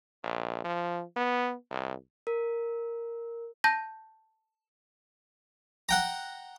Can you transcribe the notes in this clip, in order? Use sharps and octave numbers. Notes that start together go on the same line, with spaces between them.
A#1
F3
B3
C2
A#4
A5 G6 A#6
F#5 G5 A#5